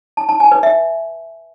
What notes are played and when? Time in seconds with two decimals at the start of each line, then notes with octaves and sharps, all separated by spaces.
0.17 A5
0.29 A5
0.40 G#5
0.52 B4
0.63 E5